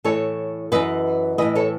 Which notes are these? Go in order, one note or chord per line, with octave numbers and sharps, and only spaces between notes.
A2 E3 A4 C#5
F#2 E3 B4 D#5
A2 E3 B4 D#5
A4 C#5